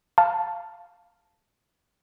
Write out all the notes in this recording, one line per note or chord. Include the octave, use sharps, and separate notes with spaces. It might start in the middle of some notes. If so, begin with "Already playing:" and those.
F5 A5